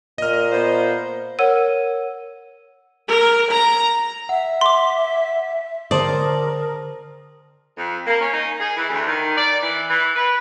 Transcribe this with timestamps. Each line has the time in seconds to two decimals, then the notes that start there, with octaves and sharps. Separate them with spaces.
0.18 A#2 D#5 F6
0.52 B3 F4 C5
1.39 A#4 C#5 F#5 E6 D#7
3.08 A#4
3.51 A#5
4.29 E5 F#5
4.61 C6 D6
5.91 D3 A#4 C5 D5 A5 D#6
7.78 F2
8.06 A#3
8.20 C#4
8.34 D#4
8.60 G#4
8.77 E3
8.90 D2
9.07 D#3
9.37 D5
9.61 E3
9.89 E3
10.16 B4